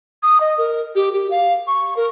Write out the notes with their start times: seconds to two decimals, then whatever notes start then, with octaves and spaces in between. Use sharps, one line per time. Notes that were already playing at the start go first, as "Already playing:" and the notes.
0.23 D#6
0.41 D#5
0.58 A#4
0.95 G4
1.13 G4
1.31 F5
1.67 C#6
1.97 A#4